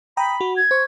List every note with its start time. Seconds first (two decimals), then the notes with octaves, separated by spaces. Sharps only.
0.17 G5 A#5 B5 D#6
0.41 F#4
0.57 G#6
0.71 C5 C#6